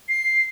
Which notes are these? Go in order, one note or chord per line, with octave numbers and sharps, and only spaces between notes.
C7